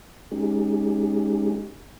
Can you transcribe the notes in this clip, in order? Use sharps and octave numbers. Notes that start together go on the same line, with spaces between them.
G#3 C#4 D#4 G4 G#4